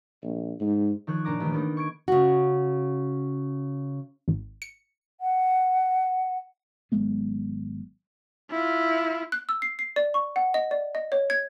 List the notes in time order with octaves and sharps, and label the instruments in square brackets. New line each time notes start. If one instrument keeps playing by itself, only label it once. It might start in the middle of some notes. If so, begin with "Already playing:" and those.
[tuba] A#1
G#2
[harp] D#3 F3 C#5 F#6 G#6
A#2 D4 A#5 D6
A1 D#3
A#3 B3 D#4
C#6 G#6 D7
[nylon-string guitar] C#3 F#4
[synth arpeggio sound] G#1
C#7
[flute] F#5
[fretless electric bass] G#1 F#3 G#3 B3
[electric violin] E4 F4
[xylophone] F#6
E6
C7
C7
D5
C#6
F#5
D#5
D5
D#5
C#5
G#6